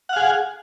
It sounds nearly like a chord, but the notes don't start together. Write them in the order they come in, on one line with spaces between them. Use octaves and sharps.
F#5 F5 G#4